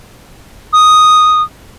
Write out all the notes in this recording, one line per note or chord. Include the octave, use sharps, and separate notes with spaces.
D#6